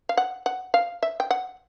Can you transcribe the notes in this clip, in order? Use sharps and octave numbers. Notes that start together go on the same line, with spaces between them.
F5
F#5
F#5
F5
E5
G5
F#5